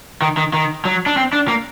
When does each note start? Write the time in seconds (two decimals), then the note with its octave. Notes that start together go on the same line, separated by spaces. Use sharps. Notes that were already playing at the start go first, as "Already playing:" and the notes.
0.22 D#3
0.37 D#3
0.54 D#3
0.85 F#3
1.06 D4
1.17 C4
1.33 D4
1.48 A#3